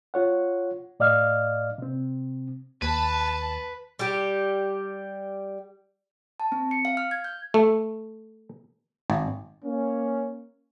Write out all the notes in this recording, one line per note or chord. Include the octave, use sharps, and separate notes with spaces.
F4 C#5 F#5
A2 D5 D#5 F5 F6
C3 C4
D#2 B4 A5
G3 G4
A5
C4
C#7
F5
F6
G#6
G6
A3
G#1
A#3 C#4